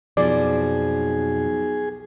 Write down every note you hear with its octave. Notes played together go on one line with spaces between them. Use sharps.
B1 F2 B2 F3 G#4 D5